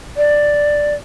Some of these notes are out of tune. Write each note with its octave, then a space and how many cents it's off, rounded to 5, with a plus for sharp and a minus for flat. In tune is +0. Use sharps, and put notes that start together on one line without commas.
D5 +5